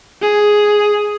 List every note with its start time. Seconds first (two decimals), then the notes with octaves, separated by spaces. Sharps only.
0.22 G#4